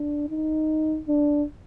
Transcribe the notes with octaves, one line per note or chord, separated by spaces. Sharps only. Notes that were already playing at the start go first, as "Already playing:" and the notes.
Already playing: D4
D#4
D4